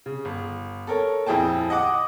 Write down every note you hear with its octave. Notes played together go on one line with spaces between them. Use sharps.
C#3
G1
A4 A#4 C#5
D#1 F2 E4 G#4 G5 A5
D#5 F#5 D6 D#6